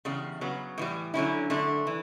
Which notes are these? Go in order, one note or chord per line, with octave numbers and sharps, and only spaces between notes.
E2 C#3 G3
C#3 F#3 B3
A2 E3 G3
D3 F#3 C#4 E4
F#2 D3 A3 D4
E3